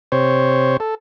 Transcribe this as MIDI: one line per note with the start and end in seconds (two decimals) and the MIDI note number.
0.12 0.77 48
0.12 0.77 72
0.12 0.77 73
0.80 0.95 69